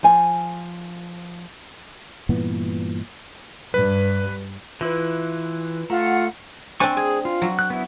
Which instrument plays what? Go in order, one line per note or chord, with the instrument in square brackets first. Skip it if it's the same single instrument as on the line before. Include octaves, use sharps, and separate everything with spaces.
[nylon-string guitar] F3 G#5
[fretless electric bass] G2 A#2 E3 B3
[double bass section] G2 [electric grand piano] B4
[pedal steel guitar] E3 E4 [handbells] F4 B4
[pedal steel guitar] A3 [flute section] F4 F#5 [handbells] A#5
[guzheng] C4 D4 [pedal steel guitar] C5 G#5 C#6
[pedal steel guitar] G#4 [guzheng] G#5
[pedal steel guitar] F4
[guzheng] F#3
[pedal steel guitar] F#6
B3 E4